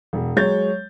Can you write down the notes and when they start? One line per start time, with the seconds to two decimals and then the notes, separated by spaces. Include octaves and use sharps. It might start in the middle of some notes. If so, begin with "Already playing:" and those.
0.13 E1
0.36 F#3 G#3 C#5 G6 A6